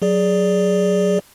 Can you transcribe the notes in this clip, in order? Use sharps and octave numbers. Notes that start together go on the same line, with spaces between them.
F#3 G#4 D5